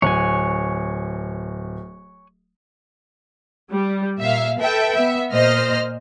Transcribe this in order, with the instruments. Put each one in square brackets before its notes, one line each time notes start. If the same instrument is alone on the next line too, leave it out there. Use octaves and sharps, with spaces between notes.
[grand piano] D1 [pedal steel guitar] C#5 F#5 G#5
[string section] G3
A#2 E5 F5
A4 B4 E5 G5
B3 E5
A#2 C5 D#5 F6